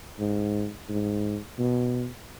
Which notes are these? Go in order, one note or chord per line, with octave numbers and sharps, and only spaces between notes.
G#2
G#2
B2